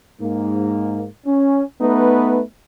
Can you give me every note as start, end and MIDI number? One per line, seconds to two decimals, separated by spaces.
0.21 1.04 44
0.21 1.04 58
1.26 1.64 61
1.81 2.41 57
1.81 2.41 59
1.81 2.41 63
1.81 2.41 71